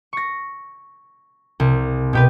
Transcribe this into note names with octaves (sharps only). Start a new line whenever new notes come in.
C#6 A#6
C2
B2 G4 B4